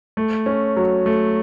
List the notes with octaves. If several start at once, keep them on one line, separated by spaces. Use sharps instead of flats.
A3
C#4
F#3
A3